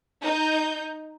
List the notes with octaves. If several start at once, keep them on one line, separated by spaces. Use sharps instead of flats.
D#4 G6